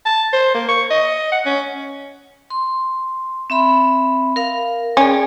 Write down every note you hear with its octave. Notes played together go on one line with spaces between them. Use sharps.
A5
C5
A#3
C#6
D#5
F#5
C#4
C6
C4 E5 B5
A#4 F5
C#4 G#4 D5 G5